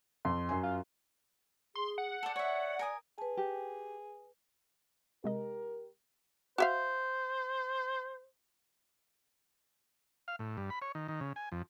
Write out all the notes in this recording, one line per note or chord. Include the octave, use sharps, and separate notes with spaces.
F2 C6
F#2 G#5
F4
G#4 C6
F#5
A4 C5 D5
C#5 D5 E5
A#4 G#5 D#6
G#4 B4 A5
G4
C3 G#3 G4 A#4 D#5
F#4 C5 E5 F5
F5
A2
G2
B5
C#5
D#3
D#3
C#3
G#5
F2